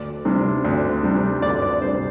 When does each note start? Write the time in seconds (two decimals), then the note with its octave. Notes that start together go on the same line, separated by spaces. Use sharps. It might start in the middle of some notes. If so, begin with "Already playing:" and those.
Already playing: D2 D5
0.25 C3 G3 D4
0.64 D2
1.03 C3 G3 D4
1.42 D2 D5
1.62 D5
1.82 C3 G3 D4 C5